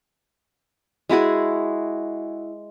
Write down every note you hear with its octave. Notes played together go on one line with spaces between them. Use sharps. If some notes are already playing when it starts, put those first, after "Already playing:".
G#3 E4 F#4 G#4